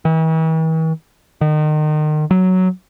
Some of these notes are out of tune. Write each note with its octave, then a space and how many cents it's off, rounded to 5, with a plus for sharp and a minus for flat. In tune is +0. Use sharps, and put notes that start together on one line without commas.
E3 -45
D#3 -30
F#3 +5